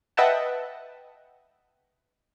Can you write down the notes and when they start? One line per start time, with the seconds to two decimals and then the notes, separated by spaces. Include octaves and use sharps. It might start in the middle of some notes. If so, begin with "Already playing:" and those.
0.17 B4 D#5 E5 F#5 G5 A5